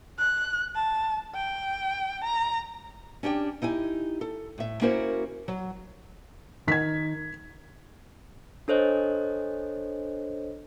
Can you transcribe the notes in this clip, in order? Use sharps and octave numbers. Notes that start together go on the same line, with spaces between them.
F#6
A5
G5
A#5
C#4 D4 G4 G5
D#4 E4 G4 G#5
A4
A2 E5
A#3 C#4 E4 F#4 A#4 C5
F#3
D#3 G#6 B6
D4 A4 C5 C#5 D#5